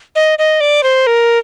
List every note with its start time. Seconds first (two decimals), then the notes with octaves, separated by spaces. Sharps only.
0.16 D#5
0.39 D#5
0.61 D5
0.83 C5
1.07 A#4